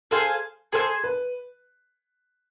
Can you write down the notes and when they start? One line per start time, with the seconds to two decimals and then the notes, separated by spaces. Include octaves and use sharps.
0.11 G#4 A4 C5 F5 G#5
0.72 G#4 A4 C5 F5 G#5
1.04 B4